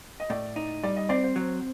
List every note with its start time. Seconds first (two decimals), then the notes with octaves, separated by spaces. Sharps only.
0.20 D#5
0.30 A2 D5
0.56 D#4
0.84 G3 D5
0.96 D#5
1.09 C4 D5
1.24 C5
1.36 F#3